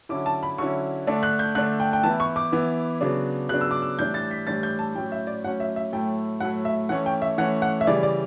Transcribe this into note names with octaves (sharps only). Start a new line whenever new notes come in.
D3 F#3 C#4 E4 D6
A5
B5
D3 F#3 C#4 E4 C#6
D3 A3 D4
F#6
G6
D3 A3 D4 F#6
G5
G5
E3 B3 E4 A5
C#6
D6
E3 B3 E4
C#3 F#3 B3 D4
C#3 F#3 B3 D4 F#6
E6
D6
E6
A2 E3 G3 D4 G6
A6
B6
A2 E3 G3 D4 A6
G6
A5
A2 F#3 C#4 G5
E5
D5
A2 F#3 C#4 F#5
E5
E5
A2 F#3 A3 G5
A2 F#3 A3 F#5
E5
E3 A3 C#4 F#5
G5
E5
E3 A3 C#4 F#5
F#5
E5
C#3 E3 G3 D5
D5